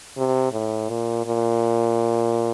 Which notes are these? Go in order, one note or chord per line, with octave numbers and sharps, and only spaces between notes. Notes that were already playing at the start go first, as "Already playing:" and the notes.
C3
A2
A#2
A#2